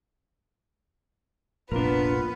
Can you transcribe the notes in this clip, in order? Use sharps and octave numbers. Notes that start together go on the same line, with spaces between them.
F1 A#1 A#2 B3 D4 F4 A#4 B4